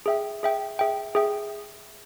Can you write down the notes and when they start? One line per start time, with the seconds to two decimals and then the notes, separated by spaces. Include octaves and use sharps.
0.06 G#4 E5 G5
0.43 G#4 E5 G5
0.79 G#4 E5 G5
1.15 G#4 E5 G5